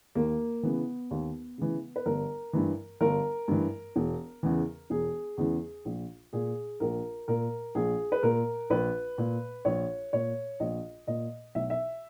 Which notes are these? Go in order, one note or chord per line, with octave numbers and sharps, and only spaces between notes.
D#2 A#3
C#3 E3 B3
D#2
C#3 E3
B4
G1 A#4
G2 E3
G1 A#4
G2 E3
E1
E2 C#3 E3
E1 G#4
E2 C#3 E3
A#1
A#2 G#4
A#1 A#4
A#2 A#4
A#1 G#4
B4
A#2 A#4
A#1 B4
A#2
A#1 C#5
A#2 C#5
A#1 D#5
A#2 D#5
B1 E5
E5